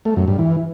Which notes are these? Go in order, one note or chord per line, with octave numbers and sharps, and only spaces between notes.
A3
F#2
G2
E3